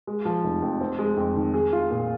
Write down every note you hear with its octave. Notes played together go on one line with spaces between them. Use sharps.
G#3
F3
F1
F2
C4
G#3
F2
D#3
G#4
F4
A#2